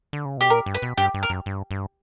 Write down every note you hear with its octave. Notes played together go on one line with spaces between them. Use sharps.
D3
C#3
B2 G4
A#2 A#4
G2
B4
B2
G2 G4
G2
A#4
F#2
G2
G2